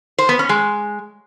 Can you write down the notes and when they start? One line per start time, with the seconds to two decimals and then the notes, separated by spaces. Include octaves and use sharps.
0.18 C5
0.29 B3
0.39 C#4
0.49 G#3